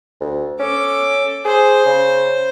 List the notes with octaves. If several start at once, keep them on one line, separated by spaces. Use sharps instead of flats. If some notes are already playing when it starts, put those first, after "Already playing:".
D2
C#4 A4 D6
G#4 C5
C#3